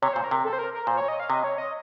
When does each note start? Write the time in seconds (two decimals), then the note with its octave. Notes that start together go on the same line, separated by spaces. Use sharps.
0.02 C3 C#5
0.13 A#2 C5
0.24 A#4
0.31 C3
0.45 A4
0.53 C5
0.59 A#4
0.73 A#4
0.87 A#2 C5
0.97 C#5
1.08 D#5
1.20 F5
1.29 C3 D#5
1.44 C#5
1.58 D#5